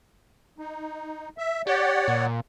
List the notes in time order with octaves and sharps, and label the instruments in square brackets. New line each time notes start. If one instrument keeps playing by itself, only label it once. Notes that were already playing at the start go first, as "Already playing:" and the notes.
[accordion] D#4
E5
[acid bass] G4 [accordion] C#5 D5 F#5
[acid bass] A#2